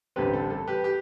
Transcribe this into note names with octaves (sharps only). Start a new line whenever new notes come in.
A1 G2 D3 G3 C4 G4 B4
A4
A4
G4 B4
G4